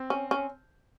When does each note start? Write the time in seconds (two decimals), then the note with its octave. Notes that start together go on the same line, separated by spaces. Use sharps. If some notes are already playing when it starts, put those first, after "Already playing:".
Already playing: C4
0.10 C#4
0.31 C#4